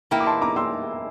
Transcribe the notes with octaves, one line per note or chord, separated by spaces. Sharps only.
E3 A#3 E4 G5 A#5
D6
A5 C6
A#5 D6
C6 E6